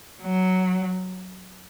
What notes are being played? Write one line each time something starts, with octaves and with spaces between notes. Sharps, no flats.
F#3